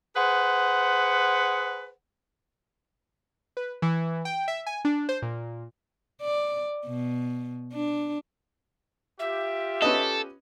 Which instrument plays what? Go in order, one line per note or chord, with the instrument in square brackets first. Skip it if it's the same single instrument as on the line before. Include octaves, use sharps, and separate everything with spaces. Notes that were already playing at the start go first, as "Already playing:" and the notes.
[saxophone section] G#4 B4 C5 F#5
[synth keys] B4
E3
G5
E5
G#5
D4
C5
A#2
[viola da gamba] D5
B2
D4
[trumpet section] F4 G4 [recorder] E5
[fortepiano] C#4 B4 D#5 [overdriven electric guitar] A4